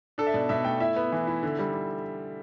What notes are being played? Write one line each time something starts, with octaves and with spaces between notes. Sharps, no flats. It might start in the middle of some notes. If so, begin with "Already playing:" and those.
D4 A4
E5
B2 D5
B2 E5
A3 G5
E4 E5
B3
E3
E4
D3
G3
D3